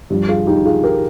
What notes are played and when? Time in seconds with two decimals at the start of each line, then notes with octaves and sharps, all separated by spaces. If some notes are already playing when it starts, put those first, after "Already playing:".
0.10 G2 F3
0.29 F4 G#4
0.47 D#4 G4
0.65 F4 G#4
0.84 G4 A#4